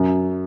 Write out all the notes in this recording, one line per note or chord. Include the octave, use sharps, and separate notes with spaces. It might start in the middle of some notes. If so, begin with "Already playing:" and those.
Already playing: F#2